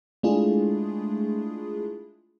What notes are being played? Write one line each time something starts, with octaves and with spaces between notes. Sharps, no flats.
G#3 A3 D4 E4 F4 G#4